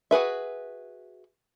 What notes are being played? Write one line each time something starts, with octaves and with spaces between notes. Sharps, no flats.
F#4 G#4 B4 E5